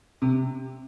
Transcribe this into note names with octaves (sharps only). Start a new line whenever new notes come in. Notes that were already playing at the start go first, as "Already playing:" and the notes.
C3